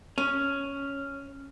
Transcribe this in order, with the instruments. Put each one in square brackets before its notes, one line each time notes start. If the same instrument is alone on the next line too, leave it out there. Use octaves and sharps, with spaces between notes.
[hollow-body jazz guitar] C#4